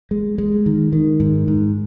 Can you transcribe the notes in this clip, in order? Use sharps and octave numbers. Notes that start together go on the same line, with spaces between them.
G#3
G#3
D#3
D#3
G#2
G#2